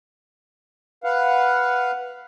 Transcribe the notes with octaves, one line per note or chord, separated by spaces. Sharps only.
B4 F5 F#5